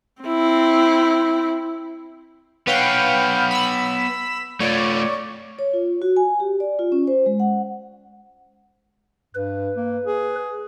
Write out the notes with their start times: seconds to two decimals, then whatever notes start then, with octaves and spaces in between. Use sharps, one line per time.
0.22 C4 E4
2.67 B3 B4 C#5 F5 G5
3.51 B5 E6
4.60 A3 F4 C#5 D5
5.59 C#5
5.73 F4
6.02 F#4
6.17 G#5
6.40 G4
6.60 D5
6.79 F4
6.92 C#4
7.07 C5
7.26 G#3
7.40 F#5
9.35 G2 B4
9.76 A#3
10.06 G#4